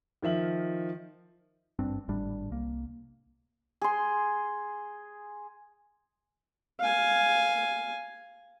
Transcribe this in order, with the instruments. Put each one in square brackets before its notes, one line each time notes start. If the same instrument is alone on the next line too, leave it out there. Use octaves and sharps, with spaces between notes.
[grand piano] D#3 F3 E5 F#7
[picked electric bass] G#1 G2 C4 D4
G#1 A2 G3 D4
C2 A#3
[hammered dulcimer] G#4 C6
[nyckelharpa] F5 G#5